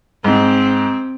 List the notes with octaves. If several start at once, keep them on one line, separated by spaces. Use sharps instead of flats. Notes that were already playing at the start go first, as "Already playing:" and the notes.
G#2 C4